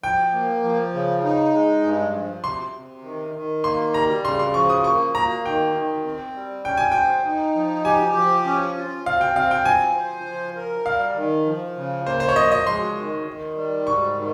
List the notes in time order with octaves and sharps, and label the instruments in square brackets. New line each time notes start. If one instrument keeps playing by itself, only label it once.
[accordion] F3 [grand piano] G5
[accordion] A#3
F3
C#3
D#4
G#3
G2
F3
[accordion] C3 [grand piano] C6
[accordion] C3
D#3
D#3
[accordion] A#3 [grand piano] C6
[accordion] G3 [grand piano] A#5
[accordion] C#3 [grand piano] C6
[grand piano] C6
[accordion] F3 [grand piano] C#6
[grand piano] D#6
[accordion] A#3 [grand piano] C#6
[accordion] A#3 [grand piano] A#5
[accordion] D#3 [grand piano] G5
[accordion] D#3
C4
G3
[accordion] C#4 [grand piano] G5
[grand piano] G#5
[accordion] C5 [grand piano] G5
[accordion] D#4
F3
[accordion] G4 [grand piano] G#5
[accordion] F3
C#4
F4
[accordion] C4 [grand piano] F5
[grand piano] G5
[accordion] C4 [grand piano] F5
[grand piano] G5
[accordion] F3 [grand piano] G#5
[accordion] C5
F3
A#4
[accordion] G3 [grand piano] F5
[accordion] D#3
F3
C#3
[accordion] A#3 [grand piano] C5
[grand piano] C5
C#5
[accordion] F3 [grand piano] D#5
[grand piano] D#5
[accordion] G#3 [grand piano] C6
[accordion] D#3
D#3
G3
[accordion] G#2 [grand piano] C#6
[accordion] D#3